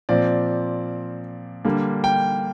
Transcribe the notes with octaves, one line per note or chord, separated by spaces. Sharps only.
A#2 F3 C4 D5
D3 G3 A#3
G5